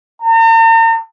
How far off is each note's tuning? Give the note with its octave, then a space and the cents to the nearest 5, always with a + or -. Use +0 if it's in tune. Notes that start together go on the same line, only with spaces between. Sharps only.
A#5 -45